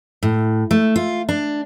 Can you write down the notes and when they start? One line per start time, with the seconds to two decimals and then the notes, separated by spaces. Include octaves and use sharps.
0.23 A2
0.71 A3
0.96 F4
1.29 D4